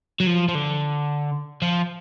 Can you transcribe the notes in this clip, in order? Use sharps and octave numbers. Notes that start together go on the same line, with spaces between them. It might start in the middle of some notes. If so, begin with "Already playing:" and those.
F#3
F3
F3
D3
F3